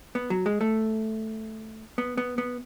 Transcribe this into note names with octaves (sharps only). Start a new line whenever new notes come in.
B3
F#3
G#3
A3
B3
B3
B3